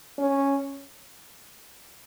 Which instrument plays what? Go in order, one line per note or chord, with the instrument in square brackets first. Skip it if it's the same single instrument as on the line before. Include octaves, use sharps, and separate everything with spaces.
[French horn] C#4